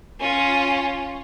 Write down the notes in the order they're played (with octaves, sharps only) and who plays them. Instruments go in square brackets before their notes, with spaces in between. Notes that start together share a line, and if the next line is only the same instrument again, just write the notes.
[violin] C#4 F4